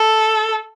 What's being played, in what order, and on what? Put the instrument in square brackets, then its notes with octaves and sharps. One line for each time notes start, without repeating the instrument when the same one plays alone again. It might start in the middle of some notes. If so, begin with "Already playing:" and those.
Already playing: [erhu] A4